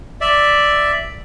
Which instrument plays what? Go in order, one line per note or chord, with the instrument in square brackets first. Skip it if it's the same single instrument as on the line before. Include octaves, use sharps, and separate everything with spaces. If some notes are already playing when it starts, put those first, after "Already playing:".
[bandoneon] D5 E5